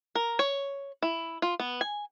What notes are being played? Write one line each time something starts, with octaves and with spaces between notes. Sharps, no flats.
A#4
C#5
E4
F4
B3
G#5